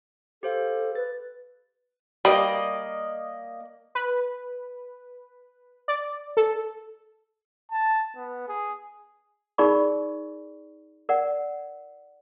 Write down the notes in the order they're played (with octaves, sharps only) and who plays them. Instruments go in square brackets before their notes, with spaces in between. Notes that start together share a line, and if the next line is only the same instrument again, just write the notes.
[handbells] G4 C5 F5 [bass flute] A4
[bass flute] B4 [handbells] A6
[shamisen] G3 [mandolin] A#3 D5 D#5
[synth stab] B4
D5
A4
[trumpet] A5
B3
G#4
[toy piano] D#4 G#4 A#4 D5 B5 C#6
A#4 D5 F#5